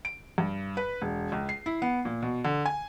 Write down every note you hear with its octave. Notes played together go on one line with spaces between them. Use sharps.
D7
G2
B4
E1
C#2
C7
E4
B3
A#2
B2
D3
G#5